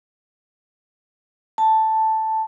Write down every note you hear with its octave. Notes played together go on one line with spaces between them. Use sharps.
A5